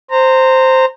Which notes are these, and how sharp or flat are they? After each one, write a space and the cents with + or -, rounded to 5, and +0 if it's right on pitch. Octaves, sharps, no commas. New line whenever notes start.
C5 +0 A#5 -20